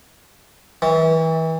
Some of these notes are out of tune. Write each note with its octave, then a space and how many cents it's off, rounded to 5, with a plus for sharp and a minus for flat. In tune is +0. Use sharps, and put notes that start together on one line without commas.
E3 -35